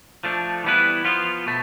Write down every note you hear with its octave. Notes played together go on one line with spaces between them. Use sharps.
F3 A3 D4
E3 G3 B3 E4 B4
F3 B3 F4
B2 A3